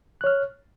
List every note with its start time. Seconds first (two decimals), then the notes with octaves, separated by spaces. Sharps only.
0.21 F#6
0.24 C#5
0.27 F6